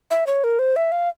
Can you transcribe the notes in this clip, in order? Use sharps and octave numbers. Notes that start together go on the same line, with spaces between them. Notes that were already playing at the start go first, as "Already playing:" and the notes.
E5
C#5
A#4
C5
E5
F5